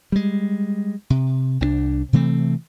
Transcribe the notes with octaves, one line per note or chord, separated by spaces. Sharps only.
G3 G#3
C3
C2 C4 D4
C3 E3 A3 C4